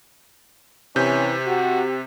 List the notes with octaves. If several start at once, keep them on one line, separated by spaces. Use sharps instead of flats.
C3 E3 C#4 G6
F#4 G4